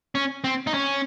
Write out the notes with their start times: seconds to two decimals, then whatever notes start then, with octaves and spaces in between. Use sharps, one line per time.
0.15 C#4
0.44 C4
0.67 D#4
0.74 C#4